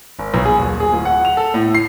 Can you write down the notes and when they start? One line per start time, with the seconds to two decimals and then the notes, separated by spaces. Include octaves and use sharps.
0.19 G#1
0.34 B1
0.45 G#4
0.59 D#1
0.80 G#4
0.93 D1
1.05 F#5
1.25 F7
1.37 A4
1.54 A2
1.75 C7